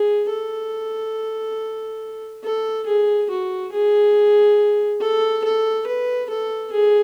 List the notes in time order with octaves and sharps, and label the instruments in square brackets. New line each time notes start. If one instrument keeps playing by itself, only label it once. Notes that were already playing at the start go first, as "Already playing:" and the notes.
Already playing: [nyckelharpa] G#4
A4
A4
G#4
F#4
G#4
A4
A4
B4
A4
G#4